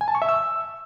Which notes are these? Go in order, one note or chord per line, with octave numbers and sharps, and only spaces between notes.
G#5
A5
C#6
E5
E6